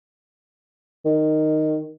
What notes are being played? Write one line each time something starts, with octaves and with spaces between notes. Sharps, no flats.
D#3